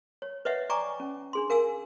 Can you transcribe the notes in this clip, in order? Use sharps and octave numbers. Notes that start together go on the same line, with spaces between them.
C#5
B4 C#5 D#5 E5 F#5
D5 G5 G#5 A#5 C#6 D6
C#4
D4 G#4 C6
A#4 F5 G#5 E6